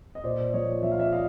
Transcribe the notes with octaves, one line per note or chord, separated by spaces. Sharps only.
D#5
A#2 C5 D5
F3 C#5 D#5
F3 E5
F5
D5 E5
A#2 D#5 F5